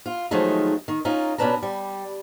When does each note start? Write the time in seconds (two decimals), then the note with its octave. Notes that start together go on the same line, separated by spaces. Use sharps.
0.06 F4
0.31 D#3 F3 F#3 G#3 A3 D#4
0.88 D#3
1.05 C#4 D#4 F4 A#4
1.38 B2 C#4 D4 B4 A5 A#5
1.63 G3